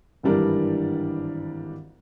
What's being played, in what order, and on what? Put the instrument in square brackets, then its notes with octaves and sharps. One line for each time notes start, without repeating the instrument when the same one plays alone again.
[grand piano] G#1 G2 E3 G3 D4 A#4